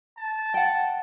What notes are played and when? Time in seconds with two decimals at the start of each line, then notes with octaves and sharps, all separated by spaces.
0.17 A5
0.54 F#5 G5